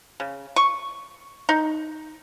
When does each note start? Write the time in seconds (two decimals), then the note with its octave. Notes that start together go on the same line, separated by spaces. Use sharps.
0.20 C#3
0.56 C#6
1.49 D#4